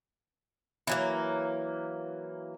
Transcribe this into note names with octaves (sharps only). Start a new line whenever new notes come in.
E3 F#3 A#3